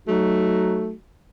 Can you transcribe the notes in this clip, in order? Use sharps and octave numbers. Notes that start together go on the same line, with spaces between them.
F#3 A3 D#4 F#4